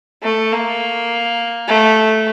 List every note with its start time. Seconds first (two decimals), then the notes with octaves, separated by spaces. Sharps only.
0.23 A3
0.52 A#3
1.68 A3